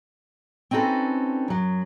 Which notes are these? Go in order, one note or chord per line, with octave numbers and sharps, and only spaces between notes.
C4 C#4 D#4 F#4 A4 B4
F#2 F#3